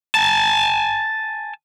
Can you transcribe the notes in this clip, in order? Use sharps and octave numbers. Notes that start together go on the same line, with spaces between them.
G#5 A5